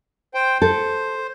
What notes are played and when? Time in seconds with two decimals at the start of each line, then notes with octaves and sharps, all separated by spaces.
0.34 C5 G5
0.62 A4 C5